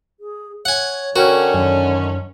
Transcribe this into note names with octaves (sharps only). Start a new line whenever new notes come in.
G#4
C#5 F#5 G#5
D3 C#4 F#4 A#4 G5
F#2 D#3